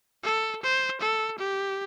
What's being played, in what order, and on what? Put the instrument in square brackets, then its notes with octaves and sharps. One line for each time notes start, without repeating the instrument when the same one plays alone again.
[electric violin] A4
C5
A4
G4